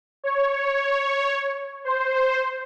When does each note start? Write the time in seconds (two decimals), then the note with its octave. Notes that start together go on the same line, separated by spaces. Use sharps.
0.24 C#5
1.85 C5